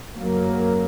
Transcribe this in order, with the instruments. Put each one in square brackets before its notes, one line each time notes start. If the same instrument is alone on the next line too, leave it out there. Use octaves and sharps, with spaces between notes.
[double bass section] F#2 C#3 F#3 A#3